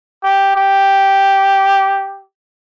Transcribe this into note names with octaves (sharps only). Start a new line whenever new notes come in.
G4
G4